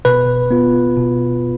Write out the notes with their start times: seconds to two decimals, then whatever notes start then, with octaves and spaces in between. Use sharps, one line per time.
0.05 B2 B4
0.51 B3 F4
0.97 B2